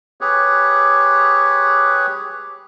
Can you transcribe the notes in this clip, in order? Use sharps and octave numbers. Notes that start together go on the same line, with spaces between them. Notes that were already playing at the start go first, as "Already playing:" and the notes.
G4 G#4 B4 C#5